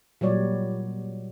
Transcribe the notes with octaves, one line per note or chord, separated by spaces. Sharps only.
A#2 F#3 G3 C#5 D5